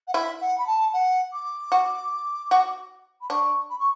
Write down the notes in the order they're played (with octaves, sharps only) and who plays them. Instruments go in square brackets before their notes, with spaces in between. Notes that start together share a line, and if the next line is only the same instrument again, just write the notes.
[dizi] F#5
[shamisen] E4 [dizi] E5
[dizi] F#5
B5
A5
F#5
D6
[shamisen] F#4
F#4
[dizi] B5
[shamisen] D4 [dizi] C#6
[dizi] B5
C#6